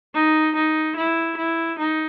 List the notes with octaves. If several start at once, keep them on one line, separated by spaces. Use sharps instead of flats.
D#4
D#4
E4
E4
D#4